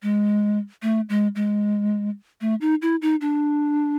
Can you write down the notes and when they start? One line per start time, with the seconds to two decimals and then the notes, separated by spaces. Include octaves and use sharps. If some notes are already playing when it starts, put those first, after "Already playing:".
0.03 G#3
0.82 A3
1.09 G#3
1.35 G#3
2.41 A3
2.61 D#4
2.82 E4
3.02 D#4
3.21 D4